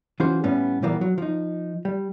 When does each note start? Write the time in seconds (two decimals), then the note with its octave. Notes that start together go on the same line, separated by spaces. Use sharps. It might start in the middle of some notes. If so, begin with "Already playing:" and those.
0.20 E3 C#4 F4 F#4 G#4 C5
0.44 A2 G3 B3 C#4
0.83 A#2 E3 F3 G3 A#3 B3
1.01 F#3
1.18 F3 D#4
1.85 G3